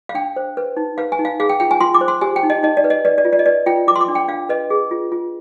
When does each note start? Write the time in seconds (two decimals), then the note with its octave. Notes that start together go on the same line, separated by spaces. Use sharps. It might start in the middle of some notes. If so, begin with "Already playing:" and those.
0.09 F5
0.15 D4 G5
0.36 C5
0.57 B4
0.77 D#4
0.98 B4 F5
1.12 G#5
1.19 D#4
1.25 F5
1.40 G#4 F5
1.49 G5
1.60 F4 G5
1.71 G#5
1.80 F4 C6
1.94 D6
2.01 C5
2.08 C6
2.21 G4 G#5
2.36 G5
2.43 D#4
2.50 D#5
2.63 D#4 D#5
2.77 D5
2.84 B4
2.90 D#5
3.05 B4 D5
3.18 D5
3.25 F4
3.33 D5
3.39 D#5
3.46 B4 D5
3.66 F4 G5
3.87 F4 D6
3.96 C6
4.01 D6
4.08 D4
4.15 G5
4.28 D4 F5
4.49 B4 D#5
4.70 G#4
4.91 F4
5.12 F4